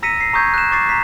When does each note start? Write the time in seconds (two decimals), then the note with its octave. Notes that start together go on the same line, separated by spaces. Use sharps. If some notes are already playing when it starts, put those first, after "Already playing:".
0.03 A#5 E6 A#6 B6 C#7 D#7
0.21 C7
0.33 A#5 C#6 D#6 G6 G#6
0.54 F#6 E7
0.71 C#6 D6 A6 C7 E7
0.89 A#5 B6